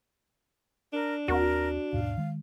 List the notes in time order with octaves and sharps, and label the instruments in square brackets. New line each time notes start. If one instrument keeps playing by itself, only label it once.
[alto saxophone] D4 [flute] A#4
[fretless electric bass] D#2 C4 [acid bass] F#4 [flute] A#4
[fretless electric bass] D#2 G#2 B2 [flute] F5
[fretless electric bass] D#3 G#3